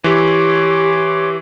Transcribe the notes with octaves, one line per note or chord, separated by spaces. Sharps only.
E3 G4 C#5 C6 D6